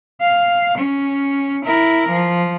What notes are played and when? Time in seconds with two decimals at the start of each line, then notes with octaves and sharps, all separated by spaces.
0.21 F5
0.78 C#4
1.65 E4 A#4
2.09 F3